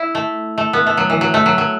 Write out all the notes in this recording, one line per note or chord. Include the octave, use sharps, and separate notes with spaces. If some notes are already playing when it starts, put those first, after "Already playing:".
Already playing: E4
A3
A3
B3
A3
F#3
E3
F#3
A3
F#3
F#3